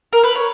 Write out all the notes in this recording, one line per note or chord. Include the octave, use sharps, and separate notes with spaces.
A#4
B4
C#5